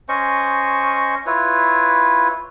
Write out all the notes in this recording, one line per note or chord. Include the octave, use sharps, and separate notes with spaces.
C#4 C5 D#5 C#6
E4 F4 B4 C#5